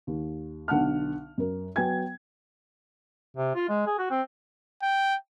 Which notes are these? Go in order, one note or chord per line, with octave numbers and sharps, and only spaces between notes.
D#2
B1 D3 F#5 A5 F6
F#2 A#4
F#3 B3 G5 G#5 G#6
C3
F4
G#3
G#4
F#4
C4
G5